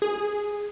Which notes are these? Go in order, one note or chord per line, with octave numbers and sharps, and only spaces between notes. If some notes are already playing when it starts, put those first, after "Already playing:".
G#4